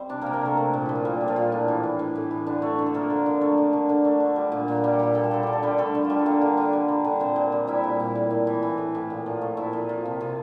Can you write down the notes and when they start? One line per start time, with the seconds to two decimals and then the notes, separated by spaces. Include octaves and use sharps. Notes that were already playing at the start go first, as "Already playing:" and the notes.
Already playing: G3 C4 C5
0.09 C3 D4 D5
0.22 C3 A#3 A#4
0.33 A#3 A#4
0.41 C3 A3 A4
0.57 A3
0.74 A#2
0.86 F3 E4
0.95 F4
1.05 A#2 G3 G4
1.21 A#2
1.28 F3 F4
1.36 A#2
1.52 A2 D4
1.68 E3
1.83 E3
1.99 A2
2.15 A2
2.31 E3
2.47 D3 D4
2.62 A3
2.79 D3
2.86 A4
2.94 F3 A#3 A#4
3.10 D3
3.26 D3
3.41 A3
3.58 D3
3.73 D3
3.89 D3
4.05 A3
4.20 D3
4.36 G3
4.52 A#2
4.68 A#2
4.84 G3 G4
4.93 A4
4.99 A#2 G4
5.14 A#2 A4
5.24 G4
5.31 D3 A4
5.43 G3 G4
5.53 A4
5.63 D3 G3 G4
5.78 D3 A3 A4
5.95 D3
6.05 F4
6.10 G3 G4
6.19 A4
6.26 D3 A#3 A#4
6.42 D3
6.57 D3
6.73 G3
6.88 D3
7.05 D3
7.20 A#2 C4 C5
7.36 A#2
7.52 G3
7.67 G3 E4 E5
7.84 A#2
8.00 A#2
8.15 A2
8.31 A2
8.47 E3
8.63 E3
8.78 A2
8.95 A2
9.10 A#2
9.26 F3
9.41 A3
9.57 A#2 E4 E5
9.73 F3
9.89 F3
10.05 C3
10.21 C3